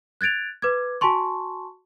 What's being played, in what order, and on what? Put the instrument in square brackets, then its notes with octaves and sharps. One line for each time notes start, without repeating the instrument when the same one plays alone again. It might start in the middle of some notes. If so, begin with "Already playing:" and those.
[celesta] F#6 G#6 A6 D7 F7
B4 D6 G#6
F#4 G#5 A5 C6 C#6